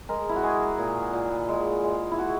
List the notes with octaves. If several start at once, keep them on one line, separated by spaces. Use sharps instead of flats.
G#3 A#4
E4
F#4
G#3 G#4
A#2
A#2
G#3
G#3
E4
G#3 F#4